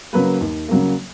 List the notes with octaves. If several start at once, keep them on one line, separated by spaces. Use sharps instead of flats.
C#3 F#3 A#3 B4
D#2
C#3 F#3 A#3